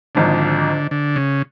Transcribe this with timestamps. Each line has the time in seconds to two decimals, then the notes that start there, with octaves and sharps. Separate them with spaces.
0.15 G#1 G#2 D3 F3
0.91 D3
1.16 C#3